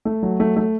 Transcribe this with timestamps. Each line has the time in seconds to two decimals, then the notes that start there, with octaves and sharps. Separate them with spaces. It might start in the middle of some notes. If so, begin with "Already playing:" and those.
0.05 A3
0.23 F#3
0.40 A3
0.57 A3